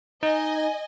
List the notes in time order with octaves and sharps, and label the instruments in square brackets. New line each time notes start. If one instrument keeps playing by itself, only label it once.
[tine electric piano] D#4 [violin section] D#5 G#5